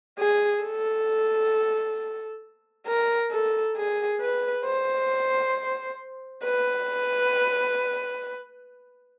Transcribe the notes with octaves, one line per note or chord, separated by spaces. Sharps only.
G#4
A4
A#4
A4
G#4
B4
C5
B4